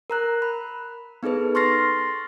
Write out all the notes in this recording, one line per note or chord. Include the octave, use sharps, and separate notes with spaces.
A#4 A#5 F#6
B5
B3 D#4 G#4 A4 B4
C6 C#6 F6 A6 A#6 C7